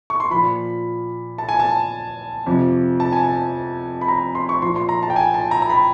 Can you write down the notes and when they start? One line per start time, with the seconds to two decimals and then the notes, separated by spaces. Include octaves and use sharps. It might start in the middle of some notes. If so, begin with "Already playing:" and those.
0.10 C#6
0.20 C6
0.30 A#2 F3 B5
1.38 A5
1.49 G#5
1.60 A5
2.46 F2 C3 F3
3.00 A5
3.13 G#5
3.25 A5
4.01 B5
4.08 A#5
4.35 C6
4.49 C#6
4.62 A#2 F3 C6
4.76 C6
4.89 A#5
5.03 A5
5.10 G5
5.16 G#5
5.34 A5
5.51 A#5
5.62 A#5
5.70 B5